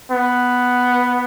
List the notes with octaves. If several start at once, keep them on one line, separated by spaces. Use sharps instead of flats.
B3